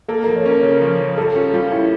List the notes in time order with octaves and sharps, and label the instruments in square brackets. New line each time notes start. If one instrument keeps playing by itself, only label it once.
[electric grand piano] A#3 [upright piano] A4
[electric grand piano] F3 [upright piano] A#4
[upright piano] C#5
[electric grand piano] C#4 [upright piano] A#4
[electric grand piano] C#3
F3
F3
[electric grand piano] G3 [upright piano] A4
[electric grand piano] C#4 [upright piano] F4
[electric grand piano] G3 [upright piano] F4
[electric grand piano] C#4 [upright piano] E4